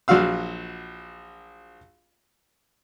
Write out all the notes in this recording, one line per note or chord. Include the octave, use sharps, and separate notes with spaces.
A#1 F#3 F#4 F5 E6